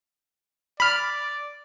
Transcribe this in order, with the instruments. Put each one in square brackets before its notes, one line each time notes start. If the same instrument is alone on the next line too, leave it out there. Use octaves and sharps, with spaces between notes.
[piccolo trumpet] D5 [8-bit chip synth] B5 F6